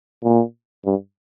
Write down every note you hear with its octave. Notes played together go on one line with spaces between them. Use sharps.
A#2
G2